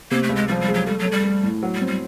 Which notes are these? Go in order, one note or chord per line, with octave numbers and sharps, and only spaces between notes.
C3 A#3
A3
C#2
G#3
F3 G3
G3
G#3
F#3
G3 A3
F#3
A3
G3
A3
A2
F#3
G3
C4
G3